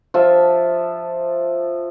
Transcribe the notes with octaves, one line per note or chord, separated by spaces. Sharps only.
F3 E5